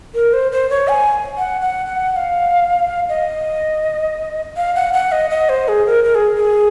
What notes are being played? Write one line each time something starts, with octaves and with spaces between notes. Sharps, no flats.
A#4
C5
C5
C#5
G#5
F#5
F#5
F#5
F#5
F5
D#5
F5
F#5
F#5
D#5
D#5
C5
G#4
A#4
A#4
G#4
G#4